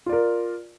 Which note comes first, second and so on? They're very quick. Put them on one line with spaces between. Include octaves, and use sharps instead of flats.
F4 D5 A#4